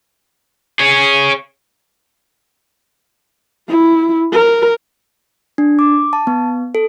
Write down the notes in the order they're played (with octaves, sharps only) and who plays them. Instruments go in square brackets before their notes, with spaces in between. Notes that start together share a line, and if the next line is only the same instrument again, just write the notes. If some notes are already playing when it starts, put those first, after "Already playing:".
[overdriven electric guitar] G#4 C#5
[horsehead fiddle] E4
A#4
[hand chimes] D4
D6
A5
B3
A4